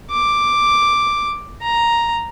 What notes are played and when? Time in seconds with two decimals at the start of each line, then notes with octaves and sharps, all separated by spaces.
0.11 D6
1.62 A#5